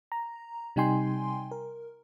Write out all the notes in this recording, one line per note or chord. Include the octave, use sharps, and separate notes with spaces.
A#5
C3 G3 D#4 G5 G#5 C6
A#4